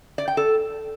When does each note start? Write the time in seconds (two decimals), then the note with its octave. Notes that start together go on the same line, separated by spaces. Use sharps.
0.18 D5
0.28 G5
0.37 A4